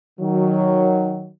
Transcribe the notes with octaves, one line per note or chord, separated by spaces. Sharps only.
D#3 F#3